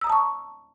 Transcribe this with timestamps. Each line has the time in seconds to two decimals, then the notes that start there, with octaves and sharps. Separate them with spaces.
0.01 E6
0.04 A#5
0.07 D#6
0.10 A5
0.12 C#6